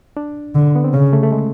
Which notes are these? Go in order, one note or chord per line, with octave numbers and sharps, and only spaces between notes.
D4
D3
B3
C4
C#3 C#4
A3
A3
G#3